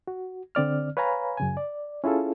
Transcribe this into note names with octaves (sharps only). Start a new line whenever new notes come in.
F#4
D3 C4 D5 F6
B4 C#5 F5 G#5 A#5 B5
F#2 C#3 G#5
D5
C#4 E4 F4 G#4 A4